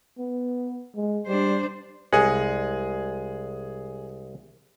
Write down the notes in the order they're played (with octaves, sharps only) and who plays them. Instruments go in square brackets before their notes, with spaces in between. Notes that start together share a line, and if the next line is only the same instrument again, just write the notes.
[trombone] B3
G#3
[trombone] G3 [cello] D4 C5
[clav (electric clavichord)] C2 G#3 F#5 [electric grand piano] G#4 G#5